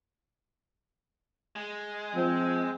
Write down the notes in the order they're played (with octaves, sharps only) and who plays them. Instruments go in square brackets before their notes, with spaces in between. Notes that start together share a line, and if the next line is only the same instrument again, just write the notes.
[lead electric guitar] G#3
[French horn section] F3 [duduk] C4